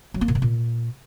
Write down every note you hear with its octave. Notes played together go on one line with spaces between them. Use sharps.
F#3
A#3
A#2
C3
A#2